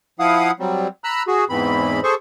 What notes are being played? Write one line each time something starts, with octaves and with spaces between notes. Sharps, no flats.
F3 E4 F5 F#5 D#6
F#3 G3 C4
A#5 B5 E6 F#6
F#4 G#4
E2 G#2 E3 C4 B5
G#4 A4 C5 C#6